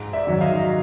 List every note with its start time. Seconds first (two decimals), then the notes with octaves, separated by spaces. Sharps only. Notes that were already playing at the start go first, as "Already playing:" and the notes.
Already playing: G#2
0.13 D5 E5
0.27 D#3 F#3
0.41 D#5 F5